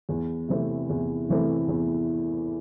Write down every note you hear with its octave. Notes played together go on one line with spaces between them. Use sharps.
E2
C3 E3 A3 C4
E2
C3 E3 A3 C4
E2